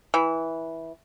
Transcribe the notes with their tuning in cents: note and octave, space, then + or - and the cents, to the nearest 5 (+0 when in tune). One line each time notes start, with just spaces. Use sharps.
E3 -10